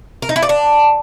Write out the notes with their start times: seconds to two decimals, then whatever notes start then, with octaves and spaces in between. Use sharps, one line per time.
0.22 A#4
0.29 D#4
0.36 E4
0.42 D5
0.49 D4